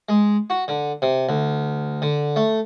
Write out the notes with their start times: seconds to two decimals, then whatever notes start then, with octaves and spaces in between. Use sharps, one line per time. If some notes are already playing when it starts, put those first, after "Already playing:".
0.09 G#3
0.50 F#4
0.68 D3
1.02 C3
1.29 D2
2.02 D3
2.36 A3